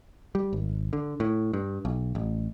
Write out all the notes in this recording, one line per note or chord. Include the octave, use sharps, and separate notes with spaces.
G3
G#1
D3
A2
G2
B1
A1